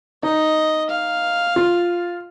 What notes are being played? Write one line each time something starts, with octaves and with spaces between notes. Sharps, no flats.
D#4 D#5
F5
F4